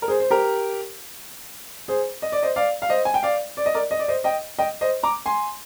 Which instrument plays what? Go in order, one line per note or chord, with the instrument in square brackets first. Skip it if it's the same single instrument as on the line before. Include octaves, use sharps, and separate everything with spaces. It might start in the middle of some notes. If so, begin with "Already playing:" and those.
[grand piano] A#4
G#4 C5
C5
G4 A#4
G#4 C5
D#5
D5
C5 D#5
D5 F5
F5
C5 D#5
G#5
G5
D5 F5
D5
D#5
A#4 D5
D#5
D5
C5 D#5
D#5 G5
D#5 G5
C5 D#5
A#5 D6
G#5 C6